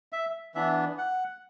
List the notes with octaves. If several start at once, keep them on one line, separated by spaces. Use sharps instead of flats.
E5
E3 B3 D4 E5
F#5